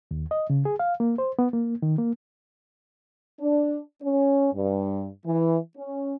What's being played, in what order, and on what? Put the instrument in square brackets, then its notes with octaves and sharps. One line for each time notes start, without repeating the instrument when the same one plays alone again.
[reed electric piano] D#2
D#5
C#3
G#4
F5
A#3
C5
B3
A#3
D#3
A#3
[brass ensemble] D4
C#4
G2
E3
C#4